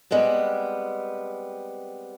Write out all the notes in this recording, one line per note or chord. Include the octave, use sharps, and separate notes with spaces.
G3 G#3 B3 C4